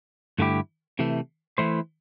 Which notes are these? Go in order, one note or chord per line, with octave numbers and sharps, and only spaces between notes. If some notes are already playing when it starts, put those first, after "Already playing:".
G2 D3 A3 E4 G4
C3 E3 A3
E3 A3 E4 C5